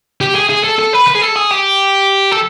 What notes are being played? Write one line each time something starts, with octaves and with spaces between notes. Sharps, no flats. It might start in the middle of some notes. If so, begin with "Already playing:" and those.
G4
G#4
G#4
A4
A4
B4
B4
G#4
A4
G#4
G4
A4